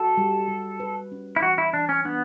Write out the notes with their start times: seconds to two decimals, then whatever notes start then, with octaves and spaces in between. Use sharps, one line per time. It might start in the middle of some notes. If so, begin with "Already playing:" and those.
Already playing: F#4 A4
0.17 G3
0.48 G3
0.80 B4
1.12 C#4
1.36 E4
1.42 E3 F#4
1.58 E4
1.74 E3 D4
1.89 C#4
2.05 B3 D4